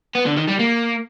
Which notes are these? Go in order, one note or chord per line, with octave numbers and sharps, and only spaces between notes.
B3
D3
D#3
G3
A#3